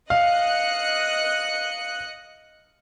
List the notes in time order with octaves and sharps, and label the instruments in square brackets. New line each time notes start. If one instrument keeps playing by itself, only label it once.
[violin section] D#5 F#6 C#7 [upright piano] F5